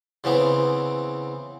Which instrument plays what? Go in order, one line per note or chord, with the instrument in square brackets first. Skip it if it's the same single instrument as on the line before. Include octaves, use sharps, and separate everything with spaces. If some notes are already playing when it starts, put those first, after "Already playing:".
[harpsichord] C#3 E3 B3 C4